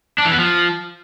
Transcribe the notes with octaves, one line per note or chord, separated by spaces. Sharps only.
D4
E3
B3
F3